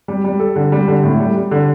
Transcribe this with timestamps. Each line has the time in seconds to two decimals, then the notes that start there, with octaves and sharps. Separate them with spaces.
0.08 G3
0.24 G3
0.40 A4
0.56 D3
0.72 G3
0.88 D3
1.04 A2
1.20 G3
1.36 G3
1.51 D3